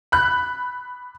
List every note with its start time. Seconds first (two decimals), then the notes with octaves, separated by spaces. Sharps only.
0.12 B5 F#6